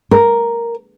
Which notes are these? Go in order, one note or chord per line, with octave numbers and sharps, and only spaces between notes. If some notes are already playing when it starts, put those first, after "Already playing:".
A#4